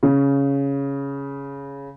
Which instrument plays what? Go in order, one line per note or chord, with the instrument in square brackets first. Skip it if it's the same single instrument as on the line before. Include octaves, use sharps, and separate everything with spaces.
[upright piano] C#3